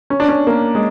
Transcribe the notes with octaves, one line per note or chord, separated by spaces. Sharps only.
C#4
D4
C#4
A#3
G#3